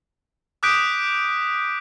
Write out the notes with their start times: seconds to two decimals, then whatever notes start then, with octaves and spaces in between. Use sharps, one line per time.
0.63 D6 D#6 F#6 G6 B6 D7